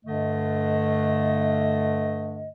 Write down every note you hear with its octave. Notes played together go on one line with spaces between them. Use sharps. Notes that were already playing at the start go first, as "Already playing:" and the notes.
G2 D3 A3 D#5